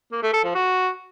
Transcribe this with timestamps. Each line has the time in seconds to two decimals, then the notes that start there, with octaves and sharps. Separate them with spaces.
0.12 A#3
0.23 A3
0.34 A4
0.44 F3
0.55 F#4